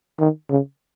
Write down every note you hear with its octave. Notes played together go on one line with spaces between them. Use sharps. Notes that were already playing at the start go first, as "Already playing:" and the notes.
D#3
C#3